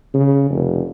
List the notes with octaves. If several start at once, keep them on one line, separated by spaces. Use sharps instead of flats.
C#3
F1